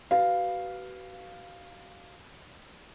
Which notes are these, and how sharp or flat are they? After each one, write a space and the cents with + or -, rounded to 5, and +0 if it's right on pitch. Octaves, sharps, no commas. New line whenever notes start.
F#4 +40 B4 +0 F5 +0